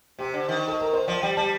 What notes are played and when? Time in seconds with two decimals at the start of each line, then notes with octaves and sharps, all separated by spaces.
0.19 C3 G4
0.34 D3
0.49 D#3
0.68 A4
0.80 A#4
0.93 C5
1.08 F3 D5
1.22 G3 G5
1.37 G3 A5